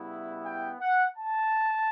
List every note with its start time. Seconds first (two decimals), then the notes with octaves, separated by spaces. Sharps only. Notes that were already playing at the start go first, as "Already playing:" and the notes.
Already playing: C#3 G3 B3 E4
0.45 G5
0.81 F#5
1.17 A5